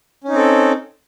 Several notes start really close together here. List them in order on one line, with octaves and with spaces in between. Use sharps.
C#4 D#4 C4 A4